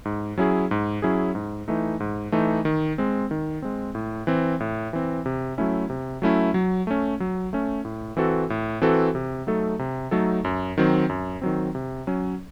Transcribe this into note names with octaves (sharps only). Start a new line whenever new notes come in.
G#2
F#3 C#4 E4 G#4
G#2
F#3 C#4 E4 G#4
G#2
E3 A3 D#4
G#2
E3 A3 D#4
D#3
G#3 C4
D#3
G#3 C4
A2
E3 C4
A2
E3 C4
C3
F#3 A3 C#4 E4
C3
F#3 A3 C#4 E4
F#3
A3 C#4
F#3
A3 C#4
A2
E3 C4 F#4 A4
A2
E3 C4 F#4 A4
C3
F#3 A3 D#4 A4
C3
F#3 A3 D#4 A4
F#2
D#3 F#3 C4
F#2
D#3 F#3 C4
C3
F#3 C#4